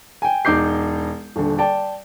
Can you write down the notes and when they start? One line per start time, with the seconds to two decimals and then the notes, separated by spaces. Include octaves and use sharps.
0.22 G5 G#5
0.45 E1 D#4 D6 G6 C7
1.36 D#1 D3
1.59 D5 G5 A5